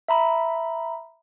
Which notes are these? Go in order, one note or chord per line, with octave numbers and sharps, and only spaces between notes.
E5 A#5 B5